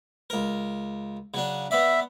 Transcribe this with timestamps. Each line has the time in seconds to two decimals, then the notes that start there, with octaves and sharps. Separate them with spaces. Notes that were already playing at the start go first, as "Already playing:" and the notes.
0.30 C#2 A#4
1.34 C#3 F#3 D4
1.71 B3 D5 E5